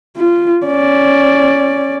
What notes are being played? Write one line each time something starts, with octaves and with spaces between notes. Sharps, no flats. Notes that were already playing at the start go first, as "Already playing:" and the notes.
F4
C#4 D5